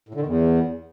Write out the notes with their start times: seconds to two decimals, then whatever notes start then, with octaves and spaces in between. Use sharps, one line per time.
0.09 A2
0.15 D3
0.20 D#3
0.26 E2